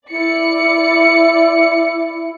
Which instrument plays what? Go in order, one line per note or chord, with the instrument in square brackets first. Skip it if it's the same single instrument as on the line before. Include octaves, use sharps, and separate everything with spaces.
[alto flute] E4 [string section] D5 C#7